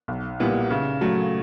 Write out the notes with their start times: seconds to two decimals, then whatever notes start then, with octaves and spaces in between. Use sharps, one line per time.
0.08 B1
0.40 A#2 G3 B3 E4
0.70 C#3
1.01 F#3 A3